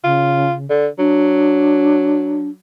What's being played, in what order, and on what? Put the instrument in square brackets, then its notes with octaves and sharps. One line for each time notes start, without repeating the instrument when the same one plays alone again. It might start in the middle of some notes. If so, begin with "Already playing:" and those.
[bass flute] C#3 [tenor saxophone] F4
[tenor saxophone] D3
[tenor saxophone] F#3 [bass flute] D4